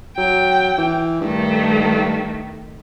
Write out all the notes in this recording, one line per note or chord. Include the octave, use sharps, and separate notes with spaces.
F#3 G5
E3
G2 D#3 A3